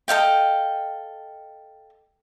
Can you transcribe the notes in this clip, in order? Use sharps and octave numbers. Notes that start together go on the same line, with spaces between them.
A4 D#5 F5 G5